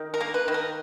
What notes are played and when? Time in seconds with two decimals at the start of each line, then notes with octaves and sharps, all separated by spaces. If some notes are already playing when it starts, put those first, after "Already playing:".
Already playing: D#3
0.14 A#4
0.20 A#3
0.34 B4
0.48 D#3
0.54 A#4